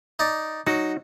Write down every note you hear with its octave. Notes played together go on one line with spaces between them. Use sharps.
D#4 D5
F#3 D#4 F#4